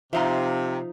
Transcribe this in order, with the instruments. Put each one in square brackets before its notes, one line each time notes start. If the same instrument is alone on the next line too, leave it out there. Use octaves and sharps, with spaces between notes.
[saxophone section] C3 [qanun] F3 D#4 C6 [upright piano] E5 F5 A#5